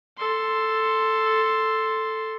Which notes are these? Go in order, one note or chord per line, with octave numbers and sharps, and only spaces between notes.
A4 C6